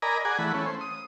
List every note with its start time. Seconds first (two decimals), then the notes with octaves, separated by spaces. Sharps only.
0.02 A#4 D5 D#5 G#5 A#5 B5
0.25 G#4 D5 F#5 G#5
0.39 E3 A3 F#5 B5
0.54 A3 C#4
0.66 C5
0.81 D#6